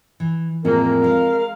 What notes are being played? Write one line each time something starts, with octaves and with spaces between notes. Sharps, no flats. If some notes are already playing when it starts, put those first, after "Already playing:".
E3
F2 A2 G#3 A#3 C4 A#4
G#3 F5